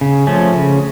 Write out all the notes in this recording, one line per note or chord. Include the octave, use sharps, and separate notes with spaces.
C#3
F3 A3 C#4
C#3